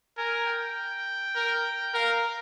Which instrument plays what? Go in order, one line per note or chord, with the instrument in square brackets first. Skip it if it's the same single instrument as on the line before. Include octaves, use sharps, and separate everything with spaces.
[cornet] A#4 [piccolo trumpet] G#5
[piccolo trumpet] G5
[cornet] A#4
[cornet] A#4 [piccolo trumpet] F5